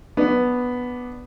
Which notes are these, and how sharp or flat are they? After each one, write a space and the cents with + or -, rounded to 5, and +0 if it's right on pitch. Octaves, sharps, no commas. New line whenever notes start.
B3 +0 D4 +0